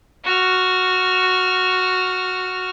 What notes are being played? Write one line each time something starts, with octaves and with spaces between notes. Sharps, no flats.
F#4 F6